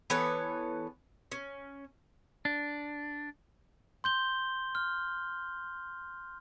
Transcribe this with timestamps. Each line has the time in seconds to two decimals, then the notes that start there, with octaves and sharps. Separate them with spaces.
0.10 E3 B3 A4 C#5
1.32 C#4
2.45 D4
4.04 C6 G6 G7
4.75 F6